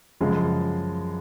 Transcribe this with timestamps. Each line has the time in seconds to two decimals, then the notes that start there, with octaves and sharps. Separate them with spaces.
0.21 F#2 C#3 F3 G#3